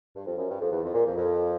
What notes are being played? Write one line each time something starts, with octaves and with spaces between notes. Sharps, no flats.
G2
F2
F#2
G2
F2
E2
F2
A#2
F2
F2